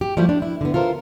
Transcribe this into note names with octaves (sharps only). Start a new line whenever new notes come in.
G4
F3 G3 A3 E4
D4
E4
D3 B3
F4 A4 A#4 C5